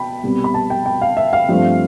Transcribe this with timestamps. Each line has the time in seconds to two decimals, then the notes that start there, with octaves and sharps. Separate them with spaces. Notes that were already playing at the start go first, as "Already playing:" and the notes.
Already playing: B2 G5 A5 B5
0.23 C2 B2 G3 B3
0.44 B5
0.54 A5
0.70 G5
0.86 G5
1.02 F5
1.17 E5
1.33 F5
1.49 G2 F3 A3 C4